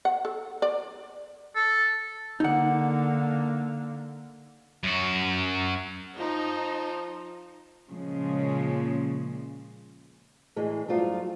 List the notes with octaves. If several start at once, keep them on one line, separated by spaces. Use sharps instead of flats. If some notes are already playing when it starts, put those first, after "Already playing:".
F#5
A4
D5
A4
D3 A#3 D#4 F#5
F#2 F#4
F3 D#4
A#2 C#3 F3 G#3
A2 E3 G#3
G2 F3 F#3 A3 F4 F#4